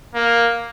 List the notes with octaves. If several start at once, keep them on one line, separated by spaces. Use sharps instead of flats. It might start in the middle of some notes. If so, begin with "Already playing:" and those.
A#3